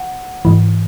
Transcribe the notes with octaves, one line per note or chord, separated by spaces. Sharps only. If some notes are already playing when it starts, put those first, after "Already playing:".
Already playing: F#5
G#2 E3